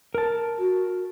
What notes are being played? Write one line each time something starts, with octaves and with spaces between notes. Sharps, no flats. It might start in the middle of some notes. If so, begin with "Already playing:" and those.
A#4 A5
F#4